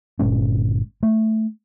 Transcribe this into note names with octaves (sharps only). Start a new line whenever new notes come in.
G1 A#2 G#3 C#4
A3